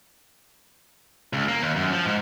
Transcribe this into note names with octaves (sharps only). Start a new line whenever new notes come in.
C#2
A#3
D#2
F#2
F3
G#2